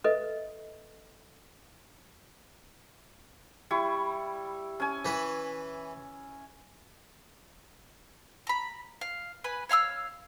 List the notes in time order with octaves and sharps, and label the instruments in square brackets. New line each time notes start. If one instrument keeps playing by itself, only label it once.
[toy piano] A4 B4 D#5 E5
[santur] G3 E4 C#6
C#4 G#5
[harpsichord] E3 B4
[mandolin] A#5 B5
F5
B4 G#5 B5
C#5 F5 C6 E6